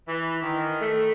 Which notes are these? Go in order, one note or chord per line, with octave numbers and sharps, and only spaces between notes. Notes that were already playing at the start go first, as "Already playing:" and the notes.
E3
D#3
A3